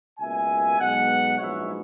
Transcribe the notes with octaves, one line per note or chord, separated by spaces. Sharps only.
C#2 B2 A#3 E5 G#5
B1 B2 G#3 B3 D#5 F#5
A#1 G#2 F#3 B3 C#5 E5